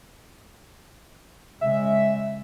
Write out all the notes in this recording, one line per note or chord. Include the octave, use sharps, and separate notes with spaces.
C#3 G#3 E5